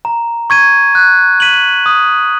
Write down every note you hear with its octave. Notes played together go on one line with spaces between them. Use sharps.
A#5
C#6 G#6 D#7
F#6
B6 D#7 F#7
D#6